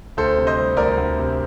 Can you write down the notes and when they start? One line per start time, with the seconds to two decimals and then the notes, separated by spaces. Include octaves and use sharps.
0.17 D2 A4 C5
0.37 C3
0.47 C5 D#5
0.57 G3
0.77 D2 A#4 D5
0.97 D2
1.18 C3